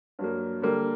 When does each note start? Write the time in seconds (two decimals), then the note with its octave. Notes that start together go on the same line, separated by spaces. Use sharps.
0.19 G2 F#3 A#3
0.62 D3 G3 A#3